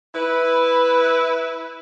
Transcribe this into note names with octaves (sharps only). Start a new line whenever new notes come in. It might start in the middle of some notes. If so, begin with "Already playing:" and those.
E4 B4